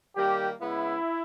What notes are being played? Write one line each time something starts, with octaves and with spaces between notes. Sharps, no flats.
D#3 G3 A#3 G4
C#3 G#3 B3 E4